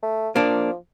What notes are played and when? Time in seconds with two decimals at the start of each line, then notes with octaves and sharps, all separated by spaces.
0.03 A3
0.36 F3 A#3 D4